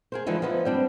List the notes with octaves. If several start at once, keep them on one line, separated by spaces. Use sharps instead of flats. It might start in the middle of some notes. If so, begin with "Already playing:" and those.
G#4 A#4 C5
D3 E3 F3 G#3 D#4 E4
F3 B3 D#4 E4 B4
G3 C4 D4